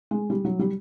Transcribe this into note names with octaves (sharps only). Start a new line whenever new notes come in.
G#3
G3
F#3
G3